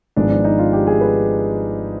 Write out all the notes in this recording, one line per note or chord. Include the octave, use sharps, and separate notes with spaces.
G#1 G#2 F3 G#3 B3 D4
D4
D#4
F4
G4
G#4
B4